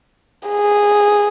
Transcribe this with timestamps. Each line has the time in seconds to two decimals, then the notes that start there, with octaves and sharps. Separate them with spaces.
0.48 G#4